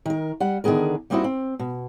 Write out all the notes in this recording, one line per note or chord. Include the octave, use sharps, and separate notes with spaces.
D#3 A#4
G3 F#5
D3 D#3 F3 B3 G#4 A#4
G3 A#3 C4 D#4 E4 F#4
C4
B2